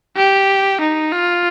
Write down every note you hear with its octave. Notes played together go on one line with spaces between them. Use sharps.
G4
D#4
F4